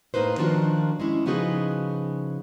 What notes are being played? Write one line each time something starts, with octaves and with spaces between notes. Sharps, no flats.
A2 A#3 D#4 B4 C5
D#3 F3 D4 F4 F#4
G#3 C#4 E4
C#3 F3 B3 D#4 F#4 G#4